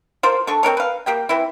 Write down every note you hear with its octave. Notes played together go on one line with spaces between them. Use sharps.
F4 A#4 C5
D3 A4 C#6
C4 D4 A#4 C#5
B4 F5
A#3 G4 G5
E3 C4 E4